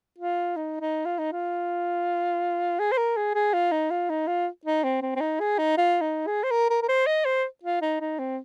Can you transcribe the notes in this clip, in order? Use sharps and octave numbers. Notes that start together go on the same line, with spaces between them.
F4
D#4
D#4
F4
D#4
F4
G#4
C5
A#4
G#4
G#4
F4
D#4
F4
D#4
F4
D#4
C4
C4
C4
D#4
G#4
D#4
F4
D#4
G#4
C5
A#4
A#4
A#4
C5
D#5
C5
F4
D#4
D#4
C4